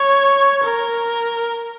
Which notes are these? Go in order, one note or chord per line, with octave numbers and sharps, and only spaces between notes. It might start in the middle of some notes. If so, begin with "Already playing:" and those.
Already playing: C#5
A#4